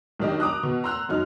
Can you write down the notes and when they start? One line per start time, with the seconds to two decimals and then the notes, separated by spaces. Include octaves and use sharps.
0.19 B1 D#3 D4 G4 D#5
0.40 A#5 D6 D#6 F#6
0.63 B2
0.84 A#5 C6 E6 F#6
1.09 F#2 F#3 D#4 F6